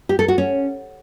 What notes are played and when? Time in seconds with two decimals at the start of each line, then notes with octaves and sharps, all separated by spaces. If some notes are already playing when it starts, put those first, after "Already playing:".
0.09 G4
0.19 A4
0.28 F#4
0.38 C#4